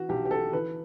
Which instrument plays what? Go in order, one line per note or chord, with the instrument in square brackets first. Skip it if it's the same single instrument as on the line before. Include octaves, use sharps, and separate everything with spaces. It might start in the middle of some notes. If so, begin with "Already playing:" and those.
Already playing: [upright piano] E3 F#4
B1 G4
G4
A4
E3 B4